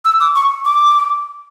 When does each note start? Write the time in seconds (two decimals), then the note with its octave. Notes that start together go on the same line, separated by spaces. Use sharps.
0.05 E6
0.20 D6
0.35 C#6
0.65 D6